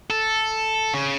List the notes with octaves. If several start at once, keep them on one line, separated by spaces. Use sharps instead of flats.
A4
C#3